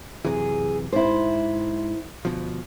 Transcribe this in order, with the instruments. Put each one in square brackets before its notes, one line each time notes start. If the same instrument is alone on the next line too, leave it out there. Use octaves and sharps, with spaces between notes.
[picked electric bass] F#2 C3 E3 [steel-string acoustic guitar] G#4
[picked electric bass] G#2 [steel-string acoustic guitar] E4 C5
[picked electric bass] D2 B2 F3